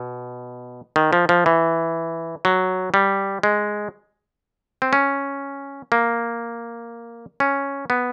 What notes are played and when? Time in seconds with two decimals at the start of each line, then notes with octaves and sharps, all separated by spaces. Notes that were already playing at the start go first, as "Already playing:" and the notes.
Already playing: B2
0.96 D#3
1.13 F3
1.29 F3
1.46 E3
2.45 F#3
2.94 G3
3.43 G#3
4.82 C4
4.93 C#4
5.92 A#3
7.40 C#4
7.90 B3